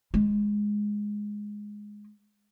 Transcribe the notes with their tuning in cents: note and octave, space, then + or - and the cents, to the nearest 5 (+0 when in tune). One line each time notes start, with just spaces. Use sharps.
G#3 +0